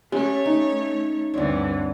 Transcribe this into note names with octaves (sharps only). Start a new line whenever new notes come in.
A3 C#4 G4 C#5
D#4
D2 G2 D3 E3 C4 C#5 D5